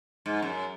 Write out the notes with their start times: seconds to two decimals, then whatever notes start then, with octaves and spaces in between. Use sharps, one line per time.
0.26 G#2
0.42 F#2